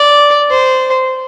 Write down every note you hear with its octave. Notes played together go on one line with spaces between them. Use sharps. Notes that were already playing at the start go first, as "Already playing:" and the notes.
Already playing: D5
C5